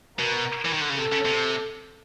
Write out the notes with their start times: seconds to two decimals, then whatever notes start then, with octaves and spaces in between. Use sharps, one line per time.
0.19 B2 A#4
0.65 E3
0.73 D#3
0.81 D3
0.90 C#3
0.98 C3 A4
1.12 C#3
1.25 C3